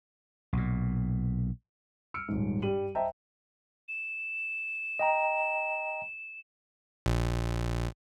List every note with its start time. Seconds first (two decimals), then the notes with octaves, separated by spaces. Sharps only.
0.53 B1 A#2
2.14 E6 F6 C#7 D7
2.28 D#1 G#2
2.62 G2 G3 D#7 F#7
2.95 C5 D#5 E5 G5 A5 A#5
3.89 E7
4.99 D#5 G5 A#5
7.06 A#1